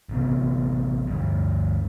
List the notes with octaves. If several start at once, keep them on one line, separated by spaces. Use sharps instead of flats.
A1 C3 B3
D2 G2